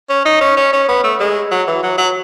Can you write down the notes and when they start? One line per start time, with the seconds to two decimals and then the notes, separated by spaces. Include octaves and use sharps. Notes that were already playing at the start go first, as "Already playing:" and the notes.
0.10 C#4
0.25 D#4
0.41 C#4
0.57 C#4
0.73 C#4
0.89 B3
1.04 A3
1.20 G#3
1.51 F#3
1.67 E3
1.83 F#3
1.98 F#3